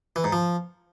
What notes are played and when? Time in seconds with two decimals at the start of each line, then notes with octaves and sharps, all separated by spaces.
0.16 E3
0.24 G#2
0.32 F3